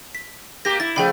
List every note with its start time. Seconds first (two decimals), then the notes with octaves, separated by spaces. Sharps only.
0.15 B6
0.65 A#3 G4 A#6
0.80 E4 A6
0.96 C#3 F3 A3 G#4 G5 B5